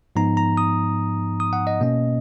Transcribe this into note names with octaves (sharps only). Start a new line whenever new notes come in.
G#2 F3 B3 D#4 A#5
A#5
D#6
D#6
F#5
D#5
B2 A#3 C#4